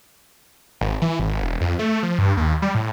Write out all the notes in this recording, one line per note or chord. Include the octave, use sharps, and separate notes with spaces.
G#1
E3
G#1
E1
F2
A3
F3
G2
D#2
G3
A2